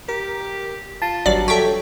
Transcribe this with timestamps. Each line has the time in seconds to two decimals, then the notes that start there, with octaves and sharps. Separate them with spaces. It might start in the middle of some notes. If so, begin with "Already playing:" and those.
0.08 G4 A#4
1.02 F4 A5
1.26 G#1 G2 F#3 D5
1.48 G4 A4 C#5 E5 G5